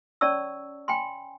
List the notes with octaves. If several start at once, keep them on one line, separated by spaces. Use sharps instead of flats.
C#4 C#5 D5 A5 C#6 E6
G5 G#5 B5 C6